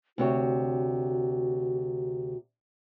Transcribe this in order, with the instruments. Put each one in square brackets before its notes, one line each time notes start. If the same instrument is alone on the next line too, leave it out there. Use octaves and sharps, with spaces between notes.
[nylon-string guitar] D2 C3 C#5 [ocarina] F#4